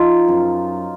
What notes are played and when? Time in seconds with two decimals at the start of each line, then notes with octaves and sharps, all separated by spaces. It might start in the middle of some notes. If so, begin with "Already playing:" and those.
Already playing: F3 D#4 F4
0.28 F#2